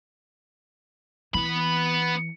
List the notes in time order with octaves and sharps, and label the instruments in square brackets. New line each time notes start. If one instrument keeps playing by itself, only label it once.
[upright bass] E3 [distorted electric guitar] B3 B5